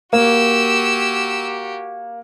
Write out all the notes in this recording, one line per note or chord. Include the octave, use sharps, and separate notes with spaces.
A#3 F#4 G4 E6